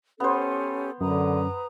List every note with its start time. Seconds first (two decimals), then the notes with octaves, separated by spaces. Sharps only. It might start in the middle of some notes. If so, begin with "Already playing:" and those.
0.20 B3 C#4 G4 A4 C5
1.01 F#2 D3 B4 A#5 D#6